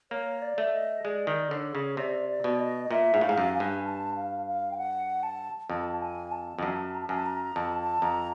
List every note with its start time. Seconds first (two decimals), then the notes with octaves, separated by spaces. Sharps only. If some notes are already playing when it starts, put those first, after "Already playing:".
0.11 A#3 C#5
0.42 D5
0.58 A3
0.73 D#5
1.04 G#3 D5
1.27 D#3
1.51 D3 C#5
1.75 C#3
1.97 C3 D5
2.29 D5
2.44 B2
2.59 D#5
2.84 D#5
2.91 A#2 E5
3.14 G#2
3.21 A2 F5
3.29 G#2
3.38 F#2
3.53 G#5
3.60 G2
3.84 A5
4.15 F5
4.46 F5
4.71 G5
4.77 F#5
5.23 A5
5.70 F2 A5
5.92 A5
6.02 G#5
6.31 A5
6.59 F2
6.63 F#2 A5
6.95 A#5
7.01 A5
7.09 F#2 G#5
7.17 A5
7.26 A#5
7.56 F2 A5
7.79 A5
8.02 F2 A#5